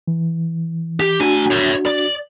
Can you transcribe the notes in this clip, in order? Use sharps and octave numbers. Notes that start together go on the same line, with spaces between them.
E3
G4
A2 D4 F#4 G#5
C#5 E5
D5